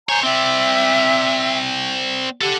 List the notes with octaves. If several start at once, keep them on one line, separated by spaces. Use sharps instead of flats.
C5 C#5 G#5 A#5 G6
C4 D5 E5 G5 E6
G4 A4 F#5